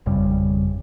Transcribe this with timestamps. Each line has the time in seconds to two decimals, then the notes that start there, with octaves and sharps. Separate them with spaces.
0.06 G#1 F2 C#3 G3